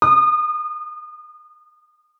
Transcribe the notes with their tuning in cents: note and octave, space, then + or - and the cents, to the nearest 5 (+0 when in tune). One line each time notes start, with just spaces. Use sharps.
D#6 -30